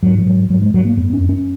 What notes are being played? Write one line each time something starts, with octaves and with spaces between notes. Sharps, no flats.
G#2 F#3
F3
G#2 F#3
G#2 F#3
G#3
G#2 F#3
A#3
F#2 B3
C#4
F#2
C#4